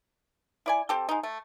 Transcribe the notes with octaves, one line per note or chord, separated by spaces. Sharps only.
E4 D5 G#5
C4 G4 A4
G#3 D#4
A3